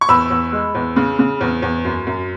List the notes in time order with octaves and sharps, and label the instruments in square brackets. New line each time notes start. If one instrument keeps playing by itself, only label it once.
[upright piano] C#6
E2 B5 E6
E2
G#3
E2
C#3
C#3
E2
E2
F#2
F#2